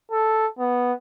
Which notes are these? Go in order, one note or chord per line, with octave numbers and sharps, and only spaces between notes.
A4
B3